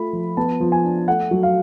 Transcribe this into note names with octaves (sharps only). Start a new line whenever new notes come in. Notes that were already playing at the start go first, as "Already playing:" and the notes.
Already playing: A3 F4 B5
F3
B3 A5
F3
G#5
D4
A3 F#5
F#3
F5